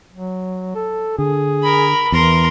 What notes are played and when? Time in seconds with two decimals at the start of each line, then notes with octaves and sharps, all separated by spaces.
0.13 F#3
0.75 A4
1.18 D3 G#4
1.63 A#4 B5
2.12 E2 E3 A#4 C6